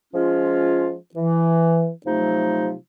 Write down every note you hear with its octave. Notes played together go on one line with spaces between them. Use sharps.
F3 G#3 C#4 F4
E3
C3 F3 F#3 A3 D#4